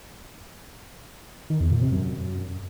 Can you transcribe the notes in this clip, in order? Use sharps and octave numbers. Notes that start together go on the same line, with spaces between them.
D#3
E2
A#2
C3
F#2